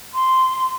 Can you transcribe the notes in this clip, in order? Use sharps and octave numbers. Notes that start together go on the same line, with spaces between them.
C6